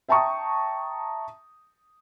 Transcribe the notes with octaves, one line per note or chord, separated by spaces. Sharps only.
E5 G5 A5 A#5 C#6 D#6